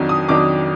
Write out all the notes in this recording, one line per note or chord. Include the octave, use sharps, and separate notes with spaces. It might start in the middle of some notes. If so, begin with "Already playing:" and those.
Already playing: F2 D#3 F#3 D4
D#6
F2 D#3 F#3 D4 D6